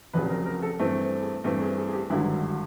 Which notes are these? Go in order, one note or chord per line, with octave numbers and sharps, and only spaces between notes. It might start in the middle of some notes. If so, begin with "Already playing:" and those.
F1 F2 C#3 F#3 B4
A#4
A#4
A4
G2 E3 A3 C4 G#4
G#4
G2 E3 A3 C4 G4
G#4
G#4
G#4
G4
G#1 G2 D3 F#3 E4